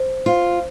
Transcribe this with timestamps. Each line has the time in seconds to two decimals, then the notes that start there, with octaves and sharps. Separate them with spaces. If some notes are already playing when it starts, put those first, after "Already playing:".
Already playing: C5
0.26 F4 C5